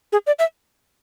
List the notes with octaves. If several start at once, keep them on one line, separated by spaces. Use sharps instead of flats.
G#4
D5
E5